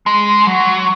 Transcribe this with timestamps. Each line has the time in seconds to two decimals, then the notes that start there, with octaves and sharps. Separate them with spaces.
0.06 G#3
0.47 F#3